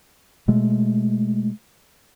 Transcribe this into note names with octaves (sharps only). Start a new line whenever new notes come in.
B2 G#3 A3